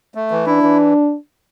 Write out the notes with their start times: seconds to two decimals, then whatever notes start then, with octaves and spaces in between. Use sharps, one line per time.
0.15 A3
0.31 E3
0.47 D4 E4
0.63 E3